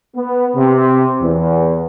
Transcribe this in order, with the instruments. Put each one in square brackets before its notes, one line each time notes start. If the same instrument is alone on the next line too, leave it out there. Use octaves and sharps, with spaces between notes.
[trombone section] B3
C3
E2